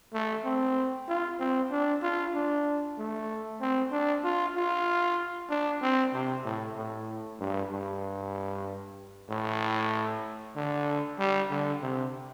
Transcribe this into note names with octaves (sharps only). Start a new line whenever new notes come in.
A3
C4
F4
C4
D4
F4
D4
A3
C4
D4
F4
F4
D4
C4
C3
A2
A2
G2
G2
A2
D3
G3
D3
C3